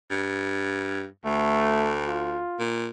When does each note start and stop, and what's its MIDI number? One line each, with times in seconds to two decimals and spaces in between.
0.11 1.06 43
1.25 2.41 38
1.25 1.99 57
2.07 2.63 65
2.59 2.89 46